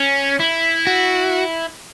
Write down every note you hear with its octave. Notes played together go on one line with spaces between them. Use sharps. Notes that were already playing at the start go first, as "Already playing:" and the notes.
Already playing: C#4
E4
F#4